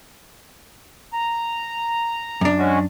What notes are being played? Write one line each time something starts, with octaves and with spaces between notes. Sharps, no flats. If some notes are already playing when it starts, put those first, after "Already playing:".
A#5
F#2 D4
G#3 C#4 F#4